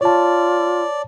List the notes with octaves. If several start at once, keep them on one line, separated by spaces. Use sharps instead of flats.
F4 C#5 D5 A5